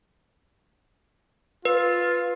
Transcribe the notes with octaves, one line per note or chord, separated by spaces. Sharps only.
F4 B4